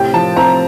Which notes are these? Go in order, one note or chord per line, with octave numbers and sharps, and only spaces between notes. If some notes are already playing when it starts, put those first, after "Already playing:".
Already playing: A2 C3 G5
F3 A5
C4 A#5